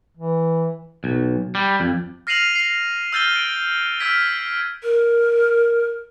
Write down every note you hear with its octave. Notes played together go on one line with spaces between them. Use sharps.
E3
B1
G3
F2
F6 A#6 C7 D#7 F7 F#7
C7
E6 F6 G6 A6 D#7 G7
D7
E6 F6 G#6 B6 D7
A#4